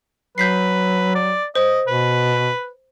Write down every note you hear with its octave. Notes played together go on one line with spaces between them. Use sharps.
F#3 B4 G6 B6 C7
D5
C5 D#5
B2 B4